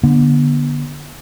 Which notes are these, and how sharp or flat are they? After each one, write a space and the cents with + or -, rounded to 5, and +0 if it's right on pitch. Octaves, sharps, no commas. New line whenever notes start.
D3 +0 B3 -35